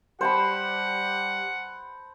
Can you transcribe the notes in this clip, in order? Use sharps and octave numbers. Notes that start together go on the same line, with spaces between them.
G3 G4 C5 F#5 A5 B5